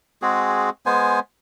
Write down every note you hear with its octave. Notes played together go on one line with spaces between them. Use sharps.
G#3 C4 F#4 G#4
G#3 B3 C5 G#5